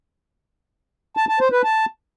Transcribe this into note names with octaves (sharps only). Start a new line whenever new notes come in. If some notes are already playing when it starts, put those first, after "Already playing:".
A5
A5
C5
B4
A5